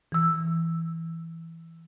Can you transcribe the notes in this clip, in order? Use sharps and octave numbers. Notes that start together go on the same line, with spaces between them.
E3 E6